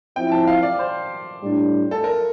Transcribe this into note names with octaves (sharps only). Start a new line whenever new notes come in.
F3 C4 E4 G5
A5
F5
D5
C5
A2 G3 D4
A4
A#4